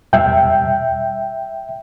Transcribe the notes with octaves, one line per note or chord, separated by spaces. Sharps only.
E2 B2 G3 E5 G5